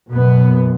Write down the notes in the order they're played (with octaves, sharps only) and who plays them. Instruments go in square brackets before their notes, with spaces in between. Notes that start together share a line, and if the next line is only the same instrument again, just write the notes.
[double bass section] F#1 F#2 B2 B3